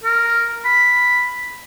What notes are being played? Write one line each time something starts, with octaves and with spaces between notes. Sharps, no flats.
A#4
B5